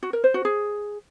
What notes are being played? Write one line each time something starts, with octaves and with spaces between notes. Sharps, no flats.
F#4
A#4
C5
F#4
G#4